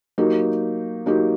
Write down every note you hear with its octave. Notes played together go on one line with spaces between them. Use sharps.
F#3 A#3 D#4 G4
F#3 A#3 D#4 G4